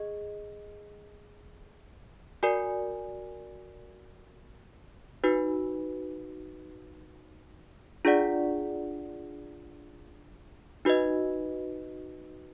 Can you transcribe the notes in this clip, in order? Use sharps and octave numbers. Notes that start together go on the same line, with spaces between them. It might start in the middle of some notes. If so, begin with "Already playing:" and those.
Already playing: G#4 D#5
F#4 A#4 D5 G#5
D#4 F#4 B4
D4 F4 G#4 D5 F#5
D#4 F#4 B4 D#5